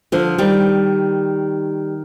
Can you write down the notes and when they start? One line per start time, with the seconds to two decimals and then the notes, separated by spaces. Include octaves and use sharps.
0.12 D3 F3
0.38 D#3 G3